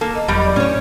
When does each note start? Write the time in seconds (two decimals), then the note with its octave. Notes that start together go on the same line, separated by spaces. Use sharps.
0.01 A#3 A4
0.15 D#5
0.28 E1 B2 F#3 G3
0.44 D5
0.56 A2 C#4 C#5